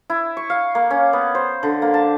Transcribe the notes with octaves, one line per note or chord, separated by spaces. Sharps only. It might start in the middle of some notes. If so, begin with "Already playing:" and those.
E4
C#6
F5
A#3
C#4
B3
C5
D3
A#3
A5